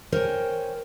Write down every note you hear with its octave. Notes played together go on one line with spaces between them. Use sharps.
A#4 C5 C#5 G5 G#5